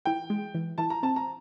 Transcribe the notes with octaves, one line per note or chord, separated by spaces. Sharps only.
E3 G5
G#3
E3
E3 A5
A#5
C4 A5
A#5